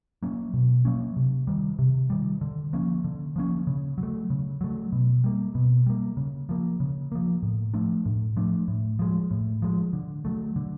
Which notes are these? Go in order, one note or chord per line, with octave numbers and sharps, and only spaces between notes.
F#3 A#3 C#4
B2
F#3 A#3 C#4
C3
D#3 G3
C3
D#3 G3
D3
F3 A#3 C#4
D3
F3 A#3 C#4
C#3
F#3
A3
C#3
F#3 A3
B2
G3 A#3
B2
G3 A#3
C#3
F3 A#3
C#3
F3 A#3
A2
F3 A3 D4
A2
F3 A3 D4
A2
F3 G#3
A2
F3 G#3
D3
F#3 A3
D3